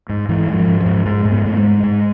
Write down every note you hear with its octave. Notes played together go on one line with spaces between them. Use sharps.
G#2
G#2 E3
G#2
F3
G#2
F3
G#2
G#2 G#3
G#2
B3
G#2 A3
G#3
G#2
G#2